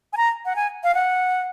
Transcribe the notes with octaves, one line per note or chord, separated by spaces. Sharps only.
G#5
A#5
F#5
G#5
F5
F#5